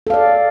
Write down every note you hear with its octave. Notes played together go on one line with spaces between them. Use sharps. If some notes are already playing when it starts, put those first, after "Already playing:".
A4 D5 F5